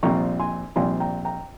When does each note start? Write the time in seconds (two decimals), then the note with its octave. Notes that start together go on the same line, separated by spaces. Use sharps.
0.03 A#1 A#2 G3 C4 A#5 C#6
0.40 G#5 C6
0.76 A#1 A#2 G3 C4 G#5 C6
1.00 G5 A#5
1.25 G5 A#5